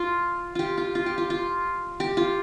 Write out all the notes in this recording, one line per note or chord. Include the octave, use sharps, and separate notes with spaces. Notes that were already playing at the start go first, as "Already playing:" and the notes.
Already playing: F4
F4 G4
F4
F4
G4
F4
F4
G4
F4